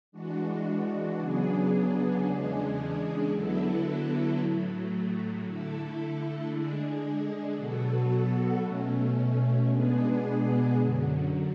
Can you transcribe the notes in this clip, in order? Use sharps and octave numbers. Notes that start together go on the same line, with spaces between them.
E3 G#3 D4 F#4
C#3 F#3 B3 D4 G#4
E2 C#3 G#3 D4 G#4
D3 F#3 B3 E4 A4
A2 F#3 A3
D3 A3 E4 A4
D3 G#3 D4 G#4
B2 F#3 B3 F#4 A4
B2 A3 C#4
B2 G#3 B3 D4 G#4
F#2 D3 F#3